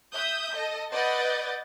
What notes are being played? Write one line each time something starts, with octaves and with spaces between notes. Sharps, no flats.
E5 D#6 G6
A4 D#5
B4 D5 D#5 F#5 G6 A6